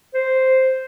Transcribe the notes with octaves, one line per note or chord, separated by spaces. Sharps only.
C5